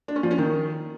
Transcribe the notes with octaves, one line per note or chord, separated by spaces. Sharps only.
D4
C#4
F3
C#4
D#3